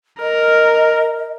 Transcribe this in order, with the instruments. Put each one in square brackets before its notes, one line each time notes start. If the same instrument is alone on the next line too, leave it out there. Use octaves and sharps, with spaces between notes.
[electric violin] A#4 [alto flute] D#5